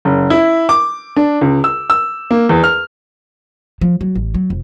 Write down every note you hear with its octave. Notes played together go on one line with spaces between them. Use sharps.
F#1
E4
D6
D4
C#2
E6
E6
A#3
E2
F6
F3
F#3
A1
F#3
F1